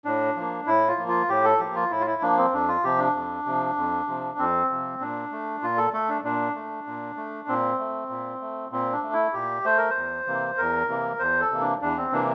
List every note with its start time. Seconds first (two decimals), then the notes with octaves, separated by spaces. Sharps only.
0.05 A2 D4
0.36 F3 A#3
0.67 A2 E4
0.88 F4
0.98 F3 A#3
1.08 F4
1.29 A2 G4
1.44 A4
1.59 F3 A#3 G4
1.76 F4
1.90 A2 E4
2.00 F4
2.07 E4
2.22 F3 A#3 D4
2.37 C4
2.52 F2 D4
2.68 F4
2.84 C3 F3 G4
2.99 D4
3.15 F2
3.46 C3 F3
3.76 F2
4.07 C3 F3
4.38 F2 C4
4.70 C3 F3
5.00 A#2 D4
5.32 A3
5.62 A#2 F4
5.78 A4
5.93 A3 A4
6.09 D4
6.24 A#2 D4
6.55 A3
6.87 A#2
7.16 A3
7.48 A#2 C4
7.79 A3
8.10 A#2
8.41 A3
8.71 A#2 C4
8.92 D4
9.03 A3
9.13 E4
9.33 A#2 G4
9.64 A3 C5
9.78 A#4
9.90 C5
9.95 E2
10.27 C3 E3 A#3
10.57 E2 A#4
10.89 C3 E3 A#3
11.19 E2 C5
11.41 A4
11.51 C3 E3 A#3
11.61 D4
11.81 E2 D4
11.97 C4
12.12 C3 E3 A#3 D4